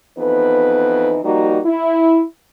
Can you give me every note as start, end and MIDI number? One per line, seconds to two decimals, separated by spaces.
0.18 1.19 41
0.18 1.19 52
0.18 1.19 59
0.18 1.19 63
0.18 1.19 71
1.24 1.59 53
1.24 1.59 55
1.24 1.59 58
1.24 1.59 63
1.24 1.59 66
1.65 2.22 64